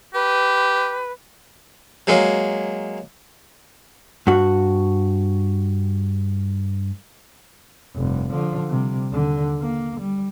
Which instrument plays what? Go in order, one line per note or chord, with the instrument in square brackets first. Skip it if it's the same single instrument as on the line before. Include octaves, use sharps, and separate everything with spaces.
[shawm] G4 [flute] B4
[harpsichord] F#3 G#3 A#3
[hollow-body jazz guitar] G2 F#4
[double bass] F1 G2
D3 F3
C3 G3
D#2 D3
A#3
G3